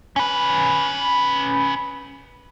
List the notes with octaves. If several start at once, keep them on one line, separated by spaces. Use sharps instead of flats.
C#4 B4